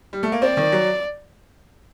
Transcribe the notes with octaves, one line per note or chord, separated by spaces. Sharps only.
G3
A3
A#3
C4 D5
D#3
F#3